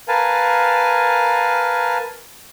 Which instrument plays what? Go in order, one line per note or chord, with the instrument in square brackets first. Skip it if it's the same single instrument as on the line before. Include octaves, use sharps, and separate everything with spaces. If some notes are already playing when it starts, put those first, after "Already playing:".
[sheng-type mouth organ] A#4 B4 F5 G#5 A5